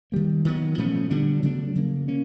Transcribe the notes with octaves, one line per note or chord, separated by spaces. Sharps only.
D#3 G3 A#3
D#3 F#3 B3
A#2 F3 A3 C#4
D3 G3 B3 D4
C#3 F#3 A3 D4
C#3 F3 A#3
A#3 C#4